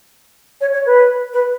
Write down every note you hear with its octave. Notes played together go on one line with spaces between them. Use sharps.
C#5
C#5
B4
B4